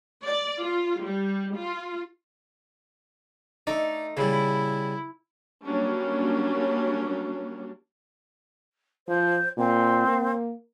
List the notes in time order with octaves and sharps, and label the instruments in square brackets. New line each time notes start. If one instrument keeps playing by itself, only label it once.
[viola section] D5
F4
G3
F4
[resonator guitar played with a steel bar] A3 D#4 [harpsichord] D5
[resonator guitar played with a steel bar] A#2 [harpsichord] C#3 G3 [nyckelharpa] E4
[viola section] F#3 G3 A#3 C#4 D4
[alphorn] F3 [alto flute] C5
[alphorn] A#2 [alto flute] C4
[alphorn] A#3